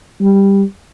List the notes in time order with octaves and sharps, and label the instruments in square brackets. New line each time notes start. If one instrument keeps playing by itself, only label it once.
[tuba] G3